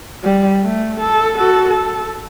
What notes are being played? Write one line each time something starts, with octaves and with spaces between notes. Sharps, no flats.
G3
A3
A4
F#4 A4
A4